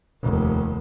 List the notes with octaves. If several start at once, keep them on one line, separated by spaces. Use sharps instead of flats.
F1 D#2